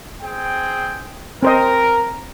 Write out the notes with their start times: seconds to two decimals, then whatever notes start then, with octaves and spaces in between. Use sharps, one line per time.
0.22 C4 G#4 G5
1.43 C4 A#4 C5 D#5